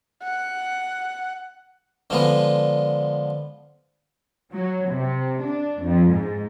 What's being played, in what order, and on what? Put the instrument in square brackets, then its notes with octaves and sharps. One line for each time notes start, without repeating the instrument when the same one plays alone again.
[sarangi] F#5
[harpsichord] D3 F3 G#3 B3
[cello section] F#3
C3
D4
F2
G#2